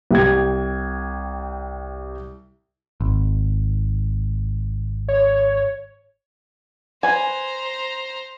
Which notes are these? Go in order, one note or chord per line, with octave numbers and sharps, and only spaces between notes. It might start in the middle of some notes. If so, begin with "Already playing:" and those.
C2 G4 G5 G#6
G#1
C#5
B4 C5 G#5 A#5